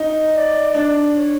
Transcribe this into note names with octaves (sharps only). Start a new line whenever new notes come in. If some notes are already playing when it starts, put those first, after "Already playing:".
Already playing: D#4
D5
D4
C#5